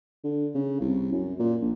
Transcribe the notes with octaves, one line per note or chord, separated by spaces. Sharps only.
D3
C#3
C2
F#2
A#2
A#1